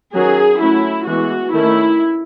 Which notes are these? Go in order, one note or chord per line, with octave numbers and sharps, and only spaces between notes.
D#3 F#3 C#4 G#4
F#3 A3 C#4 E4
E3 G#3 B3 F#4
D#3 A3 C#4 E4